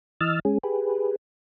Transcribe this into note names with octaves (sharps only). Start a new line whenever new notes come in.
E3 D#5 E6 F6 A6
G#3 C#4 G#4
G4 G#4 B4